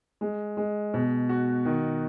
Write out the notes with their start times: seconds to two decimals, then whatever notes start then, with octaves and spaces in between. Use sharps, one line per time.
0.21 G#3
0.57 G#3
0.94 B2
1.29 F#4
1.65 D#3